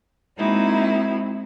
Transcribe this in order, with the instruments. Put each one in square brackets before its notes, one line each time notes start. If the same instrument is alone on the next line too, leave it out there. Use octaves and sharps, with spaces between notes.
[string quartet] G#3 A#3 C4 D#4 E4 F#4